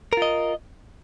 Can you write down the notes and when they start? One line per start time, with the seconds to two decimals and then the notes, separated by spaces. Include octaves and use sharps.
0.13 A#4
0.17 F4
0.22 D#5